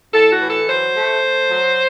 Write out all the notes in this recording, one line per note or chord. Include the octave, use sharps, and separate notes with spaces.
A2 A4
F#4
E3
A4
F#3 C5
A3
A3
F#3